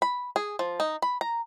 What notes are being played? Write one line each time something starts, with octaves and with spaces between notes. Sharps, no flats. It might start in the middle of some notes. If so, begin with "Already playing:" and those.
B5
G#4
F3
D#4
B5
A#5